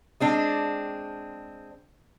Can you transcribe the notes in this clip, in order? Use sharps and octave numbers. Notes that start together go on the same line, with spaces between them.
G#3 C4 D4